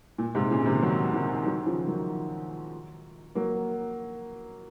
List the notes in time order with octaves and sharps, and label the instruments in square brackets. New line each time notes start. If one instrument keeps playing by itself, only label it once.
[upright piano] A#2
G#2 C3
A#2 C#3
C3 D#3
D#3 F#3
C3 D#3
D#3 F#3
C#3 F3
D#3 F#3
F#3 A#3